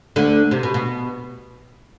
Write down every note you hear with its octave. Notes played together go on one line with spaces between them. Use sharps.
D2 D3
C3
B2
B2